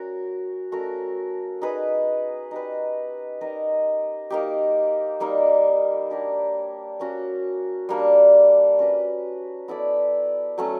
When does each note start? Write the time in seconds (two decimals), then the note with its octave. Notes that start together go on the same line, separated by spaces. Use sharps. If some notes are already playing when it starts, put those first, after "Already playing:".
Already playing: C#4 F#4 A#4
0.72 A3 C#4 F#4 A#4
1.62 D#4 G#4 B4
2.51 D#4 G4 B4
3.41 D#4 G4 A#4 D#5
4.30 A#3 D#4 G4
5.20 G3 A#3 D#4
6.10 D4 G4 A#4 C#5
7.00 A#3 C#4 F#4
7.89 G3 A#3 D4
8.79 C#4 F#4 B4
9.68 B3 E4 A4 D5
10.58 F#3 A3 C#4